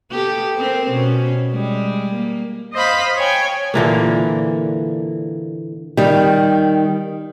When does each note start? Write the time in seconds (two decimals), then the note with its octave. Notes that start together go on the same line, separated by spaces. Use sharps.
0.11 B3 G4 A4
0.56 C4 A#4 C5
0.91 B2 C#4
1.52 G3 G#3
2.13 A#3
2.73 C5 D#5 F5 B5
3.17 C#5 G5 G#5
3.74 A#2 D3 E3 A#3
5.97 D#3 G3